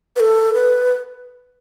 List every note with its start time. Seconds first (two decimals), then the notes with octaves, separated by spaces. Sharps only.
0.16 B4
0.20 A4
0.54 B4